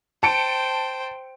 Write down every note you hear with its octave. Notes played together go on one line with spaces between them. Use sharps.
C5 G5 A5 C#7 D7